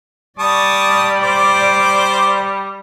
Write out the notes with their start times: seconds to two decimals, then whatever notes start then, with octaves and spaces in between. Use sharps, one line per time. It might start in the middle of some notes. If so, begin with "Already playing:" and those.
0.39 G3 D5 A5 C#6 D#6
1.23 C5 D6